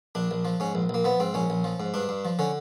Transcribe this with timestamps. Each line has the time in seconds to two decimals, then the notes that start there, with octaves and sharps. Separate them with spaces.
0.15 A#1 D4
0.31 A#1
0.45 F3
0.60 G#2 C#4
0.75 A#1
0.89 A#1 A#3
1.04 F3 B3
1.20 G#2 C4
1.34 A#1 C#4
1.50 A#1
1.64 F3
1.80 G#2
1.94 G2 D4
2.09 G2
2.25 F3
2.39 D3 C#4